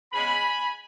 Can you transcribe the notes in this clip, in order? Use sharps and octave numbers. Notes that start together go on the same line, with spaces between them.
C#3 G#3 B3 G#5 B5